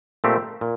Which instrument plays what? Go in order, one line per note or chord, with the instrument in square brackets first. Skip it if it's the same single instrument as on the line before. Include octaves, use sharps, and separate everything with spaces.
[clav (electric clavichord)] A#2 A3 C4 G4
A#2